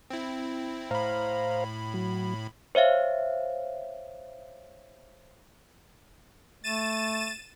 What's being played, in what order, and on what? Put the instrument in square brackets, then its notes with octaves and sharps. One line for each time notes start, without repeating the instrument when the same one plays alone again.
[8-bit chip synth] C4 E4
[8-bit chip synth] A2 B5 [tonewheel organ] C5 F5 A#5
[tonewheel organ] F#3
[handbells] C5 C#5 E5 F5
[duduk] A3 [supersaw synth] A6 D#7 E7